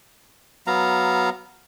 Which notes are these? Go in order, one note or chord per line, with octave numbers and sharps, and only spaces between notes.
F#3 B3 F5 A#5